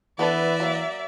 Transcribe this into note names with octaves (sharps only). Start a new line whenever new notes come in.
E3 B3 D4 A4 B4 D5 E5
F#3 A#3